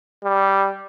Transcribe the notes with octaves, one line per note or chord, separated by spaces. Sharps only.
G3